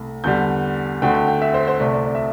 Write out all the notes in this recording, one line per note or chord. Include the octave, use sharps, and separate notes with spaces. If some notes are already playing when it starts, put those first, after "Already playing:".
Already playing: C2 A3
E2 D3 G3 G6
D2 D3 A3 G5
G5
G5
E5
C5
C5
C2 C3 A3 D5
D5
D5
E5